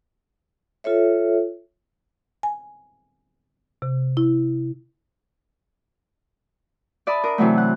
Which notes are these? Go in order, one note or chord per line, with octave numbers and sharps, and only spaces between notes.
F4 A4 C#5 E5
G#5
C3
E4
D5 E5 A5 B5 D#6
D4 A#4 D#6
C3 E3 F#3 A3
F#5